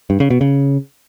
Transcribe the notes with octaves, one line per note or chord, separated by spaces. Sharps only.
G2
C#3
B2
C#3